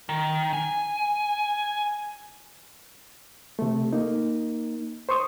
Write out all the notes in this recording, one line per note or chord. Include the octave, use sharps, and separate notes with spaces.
D#3
G#5
C3 A3
A#3 D#4
C5 C6 C#6 D#6